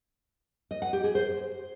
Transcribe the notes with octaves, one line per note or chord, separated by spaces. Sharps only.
D#5
F#5
G4
G#4
C5